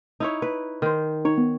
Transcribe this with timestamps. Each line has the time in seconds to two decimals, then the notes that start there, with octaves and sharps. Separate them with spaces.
0.20 D#4 E4 C#5
0.42 B4
0.82 D#3 C5
1.25 D#4 C#5
1.38 B3